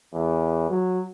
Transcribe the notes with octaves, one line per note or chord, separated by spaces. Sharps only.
E2
F#3